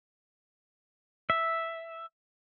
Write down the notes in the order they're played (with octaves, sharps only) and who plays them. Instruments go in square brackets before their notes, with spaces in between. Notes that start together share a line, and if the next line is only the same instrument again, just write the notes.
[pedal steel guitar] E5